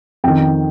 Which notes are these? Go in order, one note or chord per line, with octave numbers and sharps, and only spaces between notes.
F2 D#3 G5